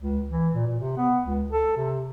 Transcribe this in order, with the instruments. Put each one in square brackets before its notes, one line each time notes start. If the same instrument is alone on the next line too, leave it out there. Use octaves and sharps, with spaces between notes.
[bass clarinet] C#2
E3
A#2
A#2
C3
B3
C#2
A4
C3